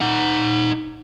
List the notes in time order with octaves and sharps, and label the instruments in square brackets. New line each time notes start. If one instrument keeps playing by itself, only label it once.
[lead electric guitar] D#4 F#5